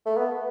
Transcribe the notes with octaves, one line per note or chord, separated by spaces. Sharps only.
A3
B3